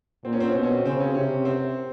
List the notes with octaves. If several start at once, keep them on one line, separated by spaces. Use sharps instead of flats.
A#2 C4
C#4
C4
C#4
B2 C4
C#4
C4
C#3 C4
C#4
C3 C#4
C4